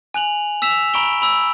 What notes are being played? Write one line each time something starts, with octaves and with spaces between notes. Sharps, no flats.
G#5 F#6 F7 F#7
E6 B6 E7 F7
A#5 B5 C#6 D7 G7
B5 E6